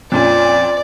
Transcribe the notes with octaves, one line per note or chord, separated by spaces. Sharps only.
F2 A#2 C#4 D5